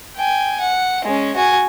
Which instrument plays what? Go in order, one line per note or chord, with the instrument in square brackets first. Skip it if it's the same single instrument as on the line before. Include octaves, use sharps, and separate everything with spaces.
[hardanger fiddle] G5 G#5
F#5
G#3 C#4
F#4 G#5